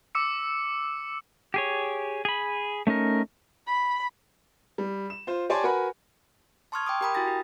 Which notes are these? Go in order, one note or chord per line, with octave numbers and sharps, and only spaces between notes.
D6 E6 C#7
G4 G#4 C#5
G#4 B5
A3 C#4 D#4 A#4
B5
G3
E7
F4 C5
G4 C#5 D5 G#5 A5 C6
F#4 A#4 B4 F#5 G#5 B5
A5 C6 C#6 D#6 F6 G#6
G5 C6 D6 D#6 G#6
G4 A#4 G5 A#5 B5 D#6
E4 F#4 G#5 A6 A#6
G4